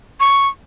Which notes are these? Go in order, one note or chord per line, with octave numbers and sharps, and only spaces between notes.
C#6